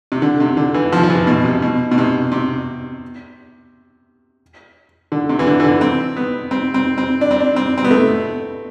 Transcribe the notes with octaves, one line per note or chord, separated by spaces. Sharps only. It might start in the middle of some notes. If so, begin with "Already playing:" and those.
C3
D3
C3
D3
E3
F3
F3
E3
B2
C3
B2
B2
C3
C3
D3
C3
E3
D3
E3
D3
C4
B3
C4
C4
C4
D4
C4
D4
C4
C4
B3
A3